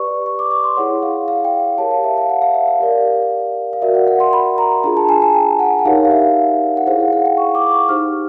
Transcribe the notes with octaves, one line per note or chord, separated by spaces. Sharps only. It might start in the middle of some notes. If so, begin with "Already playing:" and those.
Already playing: G4 B4 D5 C#6
C#6
D6
C#6
C6
E4 G#4 C#5 F#5
F5
F5
G5
G4 A#4 C#5 A5
F5
E5
F5
F#5
F5
E5
F5
G4 A#4 D5
F5
F#4 A#4 D5 E5
F#5
F#5
C6
B5
A#5
D4 F4 G#4 A#5
A5
G#5
G#5
G5
F#5
F#5
D#4 G4 A#4 C#5 F5
F5
E5
F#5
E4 G#4 C5 F5
F#5
F#5
G5
C#6
D6
C#6
D#4 G4 C5 F6